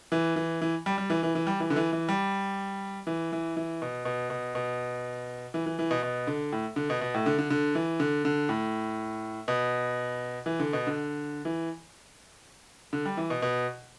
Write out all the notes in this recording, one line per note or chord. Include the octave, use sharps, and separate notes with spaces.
E3
E3
E3
G3
G3
E3
E3
E3
G3
E3
D3
E3
E3
G3
E3
E3
E3
B2
B2
B2
B2
E3
E3
E3
B2
B2
D3
A2
D3
B2
B2
A2
D3
D3
D3
E3
D3
D3
A2
B2
E3
D3
B2
D3
E3
D3
G3
E3
B2
B2